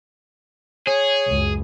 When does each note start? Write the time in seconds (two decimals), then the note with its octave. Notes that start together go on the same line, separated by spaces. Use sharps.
0.87 G#4 C#5
1.26 C#2 F#2